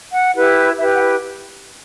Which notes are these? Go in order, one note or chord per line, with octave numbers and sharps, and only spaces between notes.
F#5
E4 G4 B4
E4 G4 B4 E5
F#5